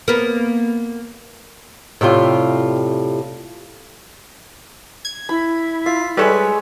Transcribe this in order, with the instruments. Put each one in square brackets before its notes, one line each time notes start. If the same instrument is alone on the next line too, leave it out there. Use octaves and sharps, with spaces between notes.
[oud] A#3 B3
[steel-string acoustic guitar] A2 C3 G3 F4
[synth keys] G#6
[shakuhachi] E4 [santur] B5
[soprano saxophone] F4 [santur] E5
[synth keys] G3 A4 [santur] G#3 C#5 E5 [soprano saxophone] B4